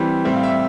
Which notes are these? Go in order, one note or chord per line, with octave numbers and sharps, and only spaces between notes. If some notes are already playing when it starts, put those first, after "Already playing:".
Already playing: E3 G3 C4
A2 G3 C4 E5
F5
E5